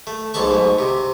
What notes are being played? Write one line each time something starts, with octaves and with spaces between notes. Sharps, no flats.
A3
B1 G#2 A3 A4 C#6
G#2 B2
C3